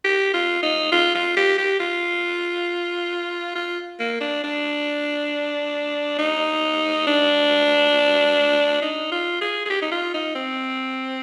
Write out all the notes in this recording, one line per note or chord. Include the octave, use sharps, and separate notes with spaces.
G4
F4
D#4
F4
F4
G4
G4
F4
F4
A#3
D4
D4
D#4
D4
D#4
F4
G#4
G#4
G4
D#4
F4
D#4
C4